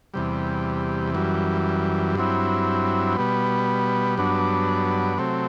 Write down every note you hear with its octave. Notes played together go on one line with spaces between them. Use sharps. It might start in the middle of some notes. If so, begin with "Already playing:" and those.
E2 C3 G3
F#2 E3 G3
G2 F#3 C4 E4
B2 G3 B3
G2 F#3 B3 D4
C3 F#3 A3 C4